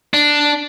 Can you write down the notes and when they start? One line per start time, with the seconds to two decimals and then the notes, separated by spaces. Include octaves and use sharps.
0.14 D4